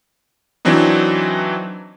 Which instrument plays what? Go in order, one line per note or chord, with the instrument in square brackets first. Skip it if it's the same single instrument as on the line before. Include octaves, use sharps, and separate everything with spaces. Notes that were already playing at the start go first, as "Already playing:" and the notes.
[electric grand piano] E3 F#3 C4 D4 D#4